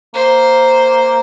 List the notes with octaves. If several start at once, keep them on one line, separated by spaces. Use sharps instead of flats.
A#3 C5